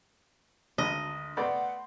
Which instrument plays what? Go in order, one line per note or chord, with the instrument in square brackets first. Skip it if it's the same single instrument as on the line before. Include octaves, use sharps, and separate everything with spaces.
[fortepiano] G#1 [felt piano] D2 [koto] D#5
[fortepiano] A3 B3 D5 [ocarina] F#5 [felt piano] B5 C6 G6